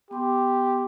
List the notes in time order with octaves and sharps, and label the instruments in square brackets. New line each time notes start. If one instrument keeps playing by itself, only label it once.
[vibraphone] B3 C6 D6 [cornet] G4